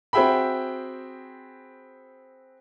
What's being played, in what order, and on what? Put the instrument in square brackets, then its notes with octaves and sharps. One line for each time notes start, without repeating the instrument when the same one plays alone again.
[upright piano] C4 F#4 G#4 E5 G5 B5